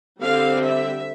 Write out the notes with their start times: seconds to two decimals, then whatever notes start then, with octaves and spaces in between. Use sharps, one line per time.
0.19 D3 G3 C4 F5
0.62 E5